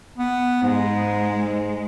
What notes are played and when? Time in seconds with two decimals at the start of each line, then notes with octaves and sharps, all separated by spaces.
0.18 B3
0.63 G#2 G#3